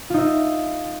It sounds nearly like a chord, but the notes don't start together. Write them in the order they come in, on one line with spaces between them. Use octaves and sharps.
F4 D#4 E5